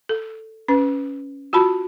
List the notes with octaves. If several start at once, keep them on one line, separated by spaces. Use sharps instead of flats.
A4
C#4 B4
F4 F#4 A5 B5